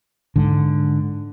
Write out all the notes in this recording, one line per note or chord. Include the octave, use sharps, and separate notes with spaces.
G#2 D3